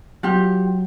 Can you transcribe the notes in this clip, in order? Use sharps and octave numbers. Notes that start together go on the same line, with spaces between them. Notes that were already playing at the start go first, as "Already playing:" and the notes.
F#3 F4 G4